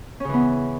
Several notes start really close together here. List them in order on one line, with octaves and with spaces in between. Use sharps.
C#4 C#3 E3 B3